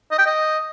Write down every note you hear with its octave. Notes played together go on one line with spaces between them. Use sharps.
D#5
G5
D#5